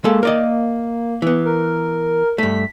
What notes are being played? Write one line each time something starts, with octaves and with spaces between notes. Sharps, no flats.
G#3 A#3 A4
A#4 D5 D#5
E3 B3
A#4
G2 A3 B6